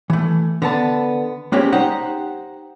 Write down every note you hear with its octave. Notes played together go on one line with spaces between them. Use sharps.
E3 A3
D3 B3 A5
G3 G#3 A#3 C4 C#4 G4
D#4 G4 C5 F#5